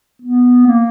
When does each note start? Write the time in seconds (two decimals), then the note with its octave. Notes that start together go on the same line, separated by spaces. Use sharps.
0.22 B3
0.67 A#3